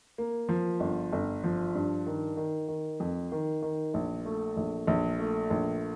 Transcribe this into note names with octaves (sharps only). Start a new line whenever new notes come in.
A#3
F3
G1
G1
F3
G2
D#3
D#3
D#3
F2
D#3
D#3
A#1
A3
A#1
A#1
A3
A#1